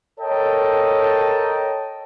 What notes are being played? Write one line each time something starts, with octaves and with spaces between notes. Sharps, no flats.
A4 A#4 C#5 D#5 G5 A5